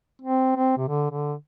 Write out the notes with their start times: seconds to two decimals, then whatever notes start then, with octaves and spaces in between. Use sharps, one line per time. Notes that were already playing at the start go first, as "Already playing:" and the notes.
0.22 C4
0.56 C4
0.78 C3
0.89 D3
1.11 D3